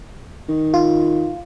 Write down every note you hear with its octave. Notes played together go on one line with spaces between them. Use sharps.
D#3
F4